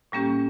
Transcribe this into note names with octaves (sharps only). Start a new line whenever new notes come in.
A2 G3 A#3 C#4 G4